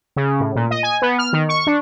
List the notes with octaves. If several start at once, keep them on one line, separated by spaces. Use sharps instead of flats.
C#3
A2
A#2
D#5
G#5
B3
F6
D#3
C#6
D4